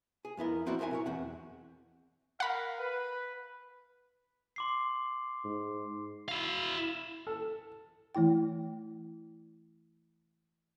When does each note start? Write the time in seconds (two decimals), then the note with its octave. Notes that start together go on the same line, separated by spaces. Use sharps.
0.25 G#4
0.37 F2 B3 E4 A#4
0.66 F3 C4 E4 F#4 C5 D5
0.79 C4 F#4 A#4 E5 G#5
0.91 B1 E4 C#5
1.06 E2 C4 F#5
2.40 A#4 F5 F#5 B5
2.79 B4
4.56 C6 D6 C7
5.44 G#2
6.28 E4 F5
7.27 A4
8.15 E3 A3 E4 G5